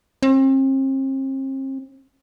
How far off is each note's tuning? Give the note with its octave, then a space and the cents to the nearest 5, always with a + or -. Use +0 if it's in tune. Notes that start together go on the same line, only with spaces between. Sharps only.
C4 +40